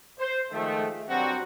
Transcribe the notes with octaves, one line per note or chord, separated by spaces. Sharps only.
C5
D#3 F3 G#3 A3
G2 F#3 G3 C4 F#4